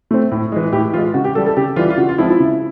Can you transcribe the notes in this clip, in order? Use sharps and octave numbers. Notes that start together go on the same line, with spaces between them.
A3 C4
A2
E3 G#3
A2 G4
E3 G#3 F4
C#3 F#4
G4
E3 G3 A4
A4
C#3 G4
E3 G3 F4
F4
C#3 F#4
F4
F3 G#3 C4 E4
E4
C#3